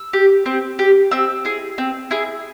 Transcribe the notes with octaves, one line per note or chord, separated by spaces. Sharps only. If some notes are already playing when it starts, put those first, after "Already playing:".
Already playing: E6
G4
C4
G4
C4 E6
E4 G#4
C4
E4 G#4